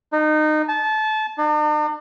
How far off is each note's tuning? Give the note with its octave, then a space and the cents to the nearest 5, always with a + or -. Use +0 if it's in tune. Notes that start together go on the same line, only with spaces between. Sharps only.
D#4 -25
A5 -25
D4 +45